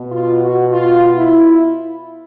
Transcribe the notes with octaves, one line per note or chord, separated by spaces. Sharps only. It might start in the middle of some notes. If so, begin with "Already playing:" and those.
Already playing: B2
F4
F#4
F4
E4